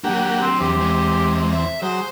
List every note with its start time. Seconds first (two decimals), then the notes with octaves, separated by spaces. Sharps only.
0.04 F#3 A#3 D4 G4 F#5
0.40 C4
0.60 E2 C4 G4
0.82 G#3
1.53 E5
1.82 F#3 G#4 C5